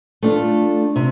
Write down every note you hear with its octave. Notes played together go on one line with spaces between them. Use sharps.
A3 D4 F4
C3